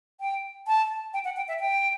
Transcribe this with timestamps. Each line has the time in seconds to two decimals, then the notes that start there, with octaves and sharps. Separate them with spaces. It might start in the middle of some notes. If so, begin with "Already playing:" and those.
0.21 G5
0.67 A5
1.13 G5
1.25 F#5
1.36 G5
1.48 E5
1.60 G5